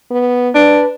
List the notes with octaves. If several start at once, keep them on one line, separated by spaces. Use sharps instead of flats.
B3
D4 B4